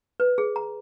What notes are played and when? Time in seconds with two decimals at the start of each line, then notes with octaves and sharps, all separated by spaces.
0.20 B4
0.38 G#4
0.56 A#5